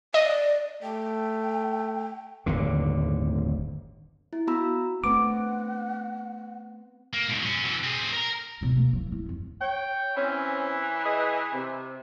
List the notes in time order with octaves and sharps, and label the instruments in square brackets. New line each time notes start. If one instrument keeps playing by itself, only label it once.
[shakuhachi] D5 [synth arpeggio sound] D#5
[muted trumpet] A3 [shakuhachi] G5
[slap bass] D1 G1 D#2 D3
[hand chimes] E4
B3 F#4 A#5 B5 E6
[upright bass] A3 D4 [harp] B3 C4 [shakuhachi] F#5 [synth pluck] D6
[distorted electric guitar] A#3
G#2 B2
F#3 C#4
B2 E3
C4 G#4
A#4 A#5
[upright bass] B2 B3
A#3
E3 F#3
E4
F2 F3
[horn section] C#5 G5
[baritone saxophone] E3 [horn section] C4 C#4
[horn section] G#4 B4 D#5
C3